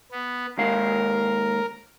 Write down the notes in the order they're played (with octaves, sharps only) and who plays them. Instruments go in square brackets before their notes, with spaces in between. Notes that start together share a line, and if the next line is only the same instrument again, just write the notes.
[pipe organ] B3
[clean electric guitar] D#2 G#3 F5 [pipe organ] A#4